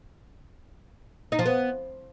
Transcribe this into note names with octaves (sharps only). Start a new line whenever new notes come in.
D#4
F3
B3